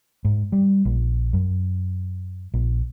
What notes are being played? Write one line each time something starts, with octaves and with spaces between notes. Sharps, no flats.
G#2
G3
A#1
F#2
A#1